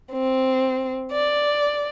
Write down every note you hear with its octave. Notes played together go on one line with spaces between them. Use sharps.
C4
D5